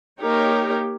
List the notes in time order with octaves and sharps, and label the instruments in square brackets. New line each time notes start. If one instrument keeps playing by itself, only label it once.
[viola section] A#3 D#4 G4 A#4 C#5